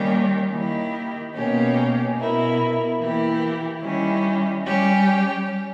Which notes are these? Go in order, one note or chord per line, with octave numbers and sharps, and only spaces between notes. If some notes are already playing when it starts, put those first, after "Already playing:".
Already playing: D#3 G3 A#3 C#4 G4
D#3 A#3 E4 G4
B2 A#3 C#4 G4
B2 A#3 E4
E3 A#3 E4 G4
D#3 G3 C#4 E4 G4
G3 C#4 G4